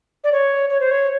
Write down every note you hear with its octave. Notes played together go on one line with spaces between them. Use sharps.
D5
C#5
C#5
C5
C#5